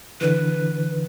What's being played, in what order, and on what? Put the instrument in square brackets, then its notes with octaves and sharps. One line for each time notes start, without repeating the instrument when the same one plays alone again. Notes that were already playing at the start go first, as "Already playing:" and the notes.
[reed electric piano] D3 E3 [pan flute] B4